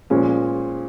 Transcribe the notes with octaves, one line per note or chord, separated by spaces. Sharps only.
A#2 F3 G#3 C#4